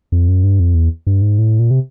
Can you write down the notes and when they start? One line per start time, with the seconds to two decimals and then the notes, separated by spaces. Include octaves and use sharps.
0.12 F2
0.28 F#2
0.44 G2
0.60 F2
0.75 E2
1.07 G2
1.22 G#2
1.38 A2
1.59 A#2
1.71 C3